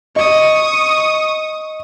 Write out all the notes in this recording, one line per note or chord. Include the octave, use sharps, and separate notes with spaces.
D#5 C#6 D#6